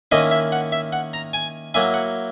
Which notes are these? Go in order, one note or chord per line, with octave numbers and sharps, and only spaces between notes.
D#3 A#3 C#4 E4 D#5
E5
F#5
E5
F#5
A#5
G#5
F#3 A#3 E4 G#5
F#5